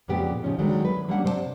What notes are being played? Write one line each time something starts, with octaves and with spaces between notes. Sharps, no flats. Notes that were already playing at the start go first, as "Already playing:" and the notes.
F2 A#2 C#3 B3 G4
C#3 F3 C#4 D#4
D#3 F#3 G#3 A3 B3 D4
B4
F#3 G3 A#3 C#4 D4 F#5
C3 C5 D5 A5